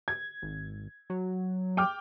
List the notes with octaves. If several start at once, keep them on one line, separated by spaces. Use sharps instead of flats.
G#6
G#1
F#3
G5 D6 F6